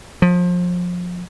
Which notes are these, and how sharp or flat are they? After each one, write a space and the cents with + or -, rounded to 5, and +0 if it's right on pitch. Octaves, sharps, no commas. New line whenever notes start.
F3 +30